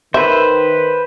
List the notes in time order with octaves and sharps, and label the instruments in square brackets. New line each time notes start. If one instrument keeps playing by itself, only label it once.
[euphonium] D#3 [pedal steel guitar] B4 C5 [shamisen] E5